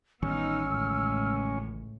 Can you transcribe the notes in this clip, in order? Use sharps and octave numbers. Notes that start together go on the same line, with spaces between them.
A1 D#3 G3 B3 C#4 D#4 E6 F6
C#2 A2